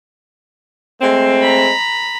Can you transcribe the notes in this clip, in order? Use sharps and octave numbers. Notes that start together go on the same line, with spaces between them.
G#3 A3 C4
A#5 B5